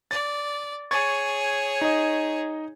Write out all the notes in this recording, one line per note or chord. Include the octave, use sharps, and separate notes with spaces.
D5 A6
G#4 C#5 C#6 G#6 A6
D#4 D#5